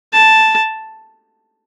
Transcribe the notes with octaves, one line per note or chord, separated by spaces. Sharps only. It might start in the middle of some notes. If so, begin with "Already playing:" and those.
A5